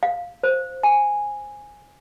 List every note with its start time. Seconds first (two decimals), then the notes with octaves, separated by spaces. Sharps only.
0.03 F5
0.43 C5
0.83 G#5